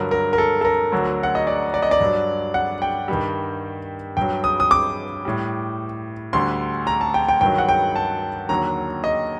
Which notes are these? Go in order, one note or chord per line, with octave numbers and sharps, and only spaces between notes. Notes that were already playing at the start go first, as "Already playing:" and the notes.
Already playing: G2 D3 F#3 A#4
A#4
A#4
A4
A4
A#4
D2 D3 F#3
F#5
D#5
D5
D5
D#5
D5
G2 F#3
F#5
G5
G2 D#3 G3
G2 F#3 G5
D#6
D#6
D6
A2 G3
D2 D3 G3 C6
A#5
A5
G5
G5
G2 D#3 F#3 G5
F#5
G5
A5
D#2 D3 F#3 A#5
D#5